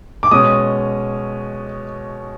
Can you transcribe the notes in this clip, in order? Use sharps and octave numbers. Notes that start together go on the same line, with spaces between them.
D6
B2 G#3 C#4 D#6